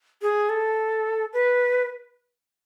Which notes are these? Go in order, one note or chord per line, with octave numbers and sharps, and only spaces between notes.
G#4
A4
B4